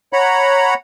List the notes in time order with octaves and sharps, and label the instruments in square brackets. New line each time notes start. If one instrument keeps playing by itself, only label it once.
[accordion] C#5 F#5 A#5 B5